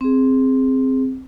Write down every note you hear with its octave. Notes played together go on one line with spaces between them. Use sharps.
C4 G#4